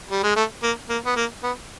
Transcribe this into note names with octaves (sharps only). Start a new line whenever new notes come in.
G3
G#3
A3
A#3
A#3
B3
A#3
B3